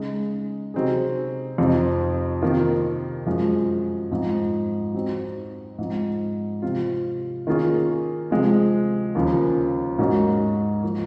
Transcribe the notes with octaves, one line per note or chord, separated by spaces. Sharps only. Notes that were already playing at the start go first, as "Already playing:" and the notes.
Already playing: C#3 G#3 D#4
C3 F#3 C4 D#4 G#4
F2 C3 F3 C4 D#4
C3 D#3 A#3 F4
F#2 F3 G#3
G#2 F3 C4
F#3 C4 D#4
G#2 F3 C4
C3 F3 C4 F4
D#3 A#3 C#4 F4 G#4
C3 F3 G#3
D#2 C#3 F3
G#2 F#3 A#3 C#4
F3 A#3 D#4